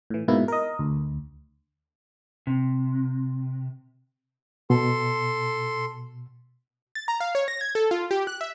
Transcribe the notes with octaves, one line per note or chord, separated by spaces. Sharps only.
A2 E3
G#2 B2 A#3 E4
A#4 D#5
D2
C3
B2 A4 C6
A6
A#5
F5
C#5
A#6
G#6
A4
F4
G4
F#6
E5